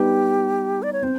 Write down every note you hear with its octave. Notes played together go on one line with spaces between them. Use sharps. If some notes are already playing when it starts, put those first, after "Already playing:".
Already playing: G3 B3 D#4 G4
D5
C#5
C4 C5